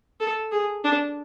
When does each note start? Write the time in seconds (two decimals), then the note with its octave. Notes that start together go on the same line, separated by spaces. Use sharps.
0.20 A4
0.52 G#4
0.84 D4